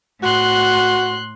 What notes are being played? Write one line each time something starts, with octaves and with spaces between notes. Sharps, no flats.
A2 F#4 C6 F#6